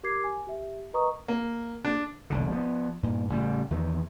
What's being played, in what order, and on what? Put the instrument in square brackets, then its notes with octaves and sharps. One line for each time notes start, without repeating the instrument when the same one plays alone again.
[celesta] G4 A#4 D6 G#6 C7
G#5
G4 E5
A#4 B4 D#5 A#5 C#6 D#6
[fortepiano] A#3
D4
[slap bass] E1 C2 D3
F3 A3 B3
G2 A#2
A1 C#3 G3
E2 D#3 E3